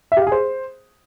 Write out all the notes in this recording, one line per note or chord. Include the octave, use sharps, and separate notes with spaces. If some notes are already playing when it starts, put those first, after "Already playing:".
E5
G4
F5
G#4
C5